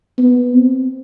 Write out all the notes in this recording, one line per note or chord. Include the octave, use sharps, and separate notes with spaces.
B3
C4